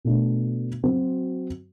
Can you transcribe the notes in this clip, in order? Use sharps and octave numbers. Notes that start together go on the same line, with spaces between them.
B2 A3 D4
F#3 C4 F#4